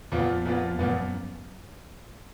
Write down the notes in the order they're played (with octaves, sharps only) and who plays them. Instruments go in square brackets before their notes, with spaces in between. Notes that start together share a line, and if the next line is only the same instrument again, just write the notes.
[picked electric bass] F2 [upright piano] A#2 F3 B3 F4
[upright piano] A#2 F3 B3 F4
[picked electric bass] F#2 [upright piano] A#2 F3 B3 F4